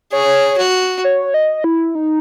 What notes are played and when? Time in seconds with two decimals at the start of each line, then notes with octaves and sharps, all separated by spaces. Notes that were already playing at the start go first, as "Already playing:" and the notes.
0.12 G#4 C#5
0.58 F#4
1.04 C#5
1.34 D#5
1.64 E4
1.95 D#4